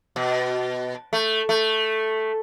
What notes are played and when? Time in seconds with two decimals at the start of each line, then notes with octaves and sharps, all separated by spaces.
0.16 B2
1.13 A3
1.49 A3